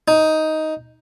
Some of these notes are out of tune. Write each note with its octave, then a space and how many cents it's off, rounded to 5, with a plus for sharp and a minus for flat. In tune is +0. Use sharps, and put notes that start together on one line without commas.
D#4 +10